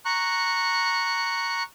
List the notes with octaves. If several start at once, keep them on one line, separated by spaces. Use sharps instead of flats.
A#5 C#6 F#6